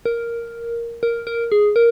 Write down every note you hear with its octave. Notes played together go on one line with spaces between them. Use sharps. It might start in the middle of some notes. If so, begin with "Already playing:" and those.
A#4
A#4
A#4
G#4
A#4